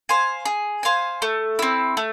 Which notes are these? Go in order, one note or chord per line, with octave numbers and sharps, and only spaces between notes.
C5 F5 G#5
G#4
C5 F5 G#5
A3
C4 E4
A3